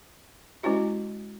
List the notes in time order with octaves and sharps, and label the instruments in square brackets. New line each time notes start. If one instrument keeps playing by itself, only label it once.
[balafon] G#3 C#4 E4 F#4 G4